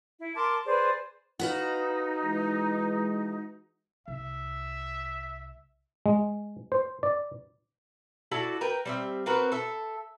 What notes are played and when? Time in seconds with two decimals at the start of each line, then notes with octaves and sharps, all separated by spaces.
0.19 E4
0.35 A#4 A5 C6 D6
0.66 G#4 B4 C5 D5
1.39 D#4 F#4 B4 F5
2.24 E3 G#3
4.08 C2 E5
6.06 G#3
6.72 C5
7.03 D5
8.32 E4 F#4 A4 D5
8.61 A#4 B4 G5
8.85 G3 C4 E5
9.26 C4 F#4 A#4 B4
9.52 A4 E5